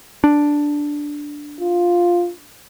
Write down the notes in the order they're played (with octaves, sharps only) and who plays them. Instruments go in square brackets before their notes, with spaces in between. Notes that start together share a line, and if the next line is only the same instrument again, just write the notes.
[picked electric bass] D4
[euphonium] F4